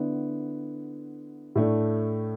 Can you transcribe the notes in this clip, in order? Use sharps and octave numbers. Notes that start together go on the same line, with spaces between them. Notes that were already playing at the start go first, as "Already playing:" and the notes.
Already playing: D3 B3 E4
A2 A3 D4